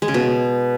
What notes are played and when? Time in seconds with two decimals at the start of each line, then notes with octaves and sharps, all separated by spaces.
0.02 G#3
0.08 C#3
0.14 B2